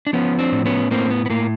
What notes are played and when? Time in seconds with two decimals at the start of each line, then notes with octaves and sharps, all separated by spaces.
0.07 D4
0.13 F3 B3 C#4
0.39 C4 D4
0.52 A2
0.65 B3 C#4
0.91 A2 A#3 C4
1.10 B3
1.26 B3
1.30 A2 A#3